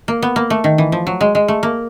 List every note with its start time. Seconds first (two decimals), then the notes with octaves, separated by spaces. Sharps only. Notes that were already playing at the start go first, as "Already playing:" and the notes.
0.08 A#3
0.22 B3
0.36 A#3
0.50 A3
0.64 D#3
0.78 E3
0.92 F3
1.07 F#3
1.21 G#3
1.35 G#3
1.48 A3
1.63 A#3